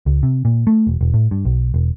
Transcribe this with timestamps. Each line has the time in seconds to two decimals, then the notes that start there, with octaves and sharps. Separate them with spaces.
0.06 C#2
0.23 C3
0.45 A#2
0.67 A3
0.87 E1
1.01 E1
1.14 A2
1.31 G2
1.45 B1
1.74 E1